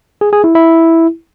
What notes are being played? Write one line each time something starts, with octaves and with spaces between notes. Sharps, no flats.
G#4
G#4
E4
E4